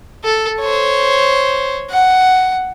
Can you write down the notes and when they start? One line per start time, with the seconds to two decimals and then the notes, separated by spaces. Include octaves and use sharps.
0.24 A4
0.61 C5 C#5
1.90 F#5